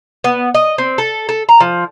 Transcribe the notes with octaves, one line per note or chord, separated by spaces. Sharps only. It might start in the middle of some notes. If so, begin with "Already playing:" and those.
B3
D#5
C4
A4
A4
A#5
F3